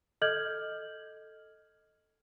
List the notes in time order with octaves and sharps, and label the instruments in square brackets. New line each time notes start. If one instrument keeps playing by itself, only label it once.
[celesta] A4 D#5 F6 G6 G#6 F#7